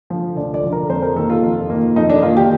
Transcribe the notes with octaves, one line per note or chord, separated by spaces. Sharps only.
D3 F3
D2 D5
D5
D3 F3
A#4
F2 C5
A#4
D#3 A#3 A4
F4
F2
D#3 A#3
F2 D#4
D4
D#3 A#3 F4
G4